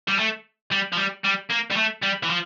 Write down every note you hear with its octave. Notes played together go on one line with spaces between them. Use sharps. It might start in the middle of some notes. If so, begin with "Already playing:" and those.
G3
A3
G3
F3
G3
G3
A#3
G3
A3
G3
E3
F3